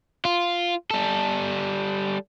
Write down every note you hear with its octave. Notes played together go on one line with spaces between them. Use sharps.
F4
G3 A4